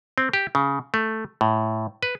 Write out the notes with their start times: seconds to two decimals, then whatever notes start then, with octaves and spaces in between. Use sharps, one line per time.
0.18 C4
0.33 G4
0.55 C#3
0.94 A3
1.41 A2
2.03 B4